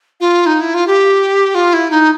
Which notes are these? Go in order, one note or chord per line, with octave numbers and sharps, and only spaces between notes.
F4
D#4
E4
F4
G4
F4
E4
D#4